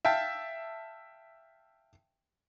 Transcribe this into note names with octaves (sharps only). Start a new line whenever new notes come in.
E5 F5 G5 A5